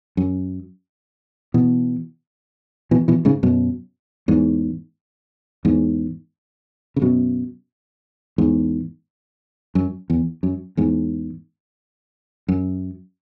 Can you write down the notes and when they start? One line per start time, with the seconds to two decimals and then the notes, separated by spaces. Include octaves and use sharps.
0.17 F#2
1.54 B2 E3
2.91 B2 E3
3.08 B2 E3
3.25 G#2 C#3
3.43 F#2 B2
4.28 E2 G#2
5.65 E2 G#2
6.96 C#3
7.02 F#2 B2
8.38 E2 G#2
9.75 F#2
10.10 E2
10.43 F#2
10.77 E2 G#2
12.48 F#2